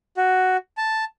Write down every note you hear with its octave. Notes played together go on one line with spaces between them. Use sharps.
F#4
A5